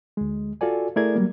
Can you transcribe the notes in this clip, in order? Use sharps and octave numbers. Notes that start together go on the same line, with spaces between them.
D2 G#3
F4 F#4 A4 D5 G#5
A3 E4 G#4 A#4 D5 G#6
F#3 G3 A#3